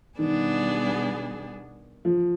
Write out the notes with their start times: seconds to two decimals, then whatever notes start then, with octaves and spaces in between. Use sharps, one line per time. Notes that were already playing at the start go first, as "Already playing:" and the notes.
0.18 B2 D#3 G3 B3 D4 G#4
2.05 F3